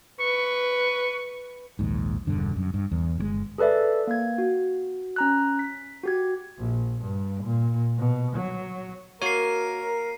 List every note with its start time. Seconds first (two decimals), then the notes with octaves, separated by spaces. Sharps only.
0.21 B4 C#6
1.79 A#1 D#2 G#2
2.27 E1 E2 G2 D3
2.56 F#2
2.74 G2
2.92 E2
3.18 G1 D3 G#3
3.58 G#4 A4 B4 D5 E5
4.07 A#3 G#6
4.38 F#4
5.16 C#4 A#5 F#6
5.59 B6
6.04 F#4 G4 G#6
6.58 A#1
7.02 G2
7.44 A#2
7.98 B2
8.37 F#3
9.22 A#3 F#4 A#4 C#5 C7 D#7